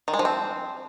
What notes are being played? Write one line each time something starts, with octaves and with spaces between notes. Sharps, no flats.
D#3
G#3
F3
C4